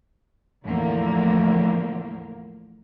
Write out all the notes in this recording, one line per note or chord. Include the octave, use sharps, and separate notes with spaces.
E2 A2 D3 F3 A3 A#3